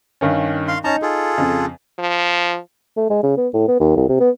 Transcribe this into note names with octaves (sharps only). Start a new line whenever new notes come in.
G2 D#3 C#4
F5 C6
C#4 D#4 A5 A#5
F4 G#4 A4
F2 C#3
F3
A3
G#3
C#3
B3
A2
B3
D#2
C2
C3
B3